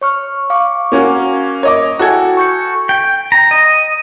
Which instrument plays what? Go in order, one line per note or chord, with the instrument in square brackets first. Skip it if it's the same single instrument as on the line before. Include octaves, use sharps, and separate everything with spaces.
[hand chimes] C#5 C#6 F6
F5 C#6 D6
[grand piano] A#3 C#4 F#4
C#5 D#5 D6
[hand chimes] E4 G5 G#5 [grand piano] F#4 A4 G#6
[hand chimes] C#6 G6 C#7
[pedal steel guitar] G5
A#5
D#5